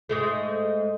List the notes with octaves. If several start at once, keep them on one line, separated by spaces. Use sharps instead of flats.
G#2 G#3 A3